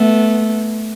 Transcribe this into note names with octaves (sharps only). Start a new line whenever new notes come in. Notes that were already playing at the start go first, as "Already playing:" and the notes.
Already playing: A3 B3